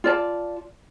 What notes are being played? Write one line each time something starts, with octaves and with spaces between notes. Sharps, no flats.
F4 D5 A5